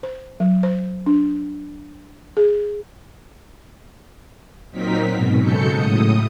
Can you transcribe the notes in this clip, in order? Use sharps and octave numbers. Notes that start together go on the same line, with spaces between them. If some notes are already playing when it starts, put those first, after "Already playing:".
C5
F#3
C5
D4
G#4
A#2 F#3 C4 D#4 A#4 B6
G#2 B2
C#3 F#3 G#3 A4 G6 C#7
A2 D#6